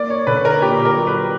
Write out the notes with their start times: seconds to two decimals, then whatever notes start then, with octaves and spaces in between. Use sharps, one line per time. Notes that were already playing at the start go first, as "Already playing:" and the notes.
Already playing: A#3 D5
0.10 C#5
0.27 D3 B4
0.45 A#4
0.61 A#2 G4
0.85 A#4
0.96 F#3
1.07 B4